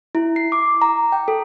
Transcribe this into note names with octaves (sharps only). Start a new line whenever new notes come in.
E4
C7
D6
A#5
G5
A4